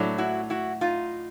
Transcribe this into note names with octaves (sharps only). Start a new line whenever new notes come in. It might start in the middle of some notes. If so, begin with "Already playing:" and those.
Already playing: A2 F#3 A3 D4
E4 F#4
E4 F#4
D#4 F4